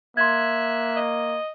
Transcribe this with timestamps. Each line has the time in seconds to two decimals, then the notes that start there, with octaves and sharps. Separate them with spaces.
0.17 A#3 E5 C6 F#6 G#6
0.96 D#5